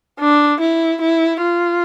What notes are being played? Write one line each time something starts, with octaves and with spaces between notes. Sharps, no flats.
D4
E4
E4
F4